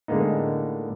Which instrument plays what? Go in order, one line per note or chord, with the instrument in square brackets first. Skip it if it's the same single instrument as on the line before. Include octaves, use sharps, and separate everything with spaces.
[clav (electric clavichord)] A2 D3 G#3 A#3 B3 D#4